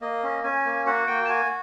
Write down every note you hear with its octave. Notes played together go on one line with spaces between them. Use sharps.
A#3 D#5
C#4
C#4 G#5
A#3
F#4 F#5
A#3 G5
A5
F#4 G#5